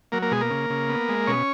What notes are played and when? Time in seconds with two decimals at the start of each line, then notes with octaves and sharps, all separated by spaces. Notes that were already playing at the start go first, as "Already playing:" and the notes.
0.12 F#3 A#3 A#4
0.22 A#3 A#4
0.31 B2 G#3 G#4
0.41 A#3 A#4
0.50 C#3
0.70 C#3
0.89 B3
1.09 G#3
1.27 B2 C#4 C#5